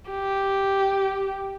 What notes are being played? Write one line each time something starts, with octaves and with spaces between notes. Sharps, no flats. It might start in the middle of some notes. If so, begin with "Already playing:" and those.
G4